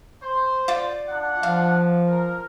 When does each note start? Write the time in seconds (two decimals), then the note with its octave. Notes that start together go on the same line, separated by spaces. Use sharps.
0.21 C5
0.68 F4 D5
1.09 D4 F#5
1.43 F3 F5
2.08 A#4